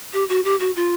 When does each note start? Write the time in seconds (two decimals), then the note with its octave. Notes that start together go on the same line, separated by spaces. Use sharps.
0.13 G4
0.29 F#4
0.45 G4
0.60 F#4
0.76 F4